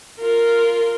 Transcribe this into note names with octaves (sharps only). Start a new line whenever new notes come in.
F4 A#4